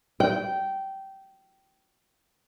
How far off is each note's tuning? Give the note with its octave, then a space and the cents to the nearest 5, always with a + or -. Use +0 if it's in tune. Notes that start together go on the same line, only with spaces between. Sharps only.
G5 -15